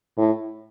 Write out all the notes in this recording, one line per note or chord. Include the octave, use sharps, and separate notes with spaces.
A2